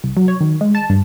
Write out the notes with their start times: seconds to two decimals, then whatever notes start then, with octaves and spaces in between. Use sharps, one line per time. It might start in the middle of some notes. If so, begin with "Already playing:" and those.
0.04 C2
0.17 F#3
0.28 C#5
0.41 D#3
0.61 G#3
0.75 A5
0.90 G2